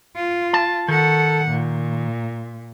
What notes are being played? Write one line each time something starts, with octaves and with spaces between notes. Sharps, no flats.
F4
A5
D#3 A4 F#5
A#2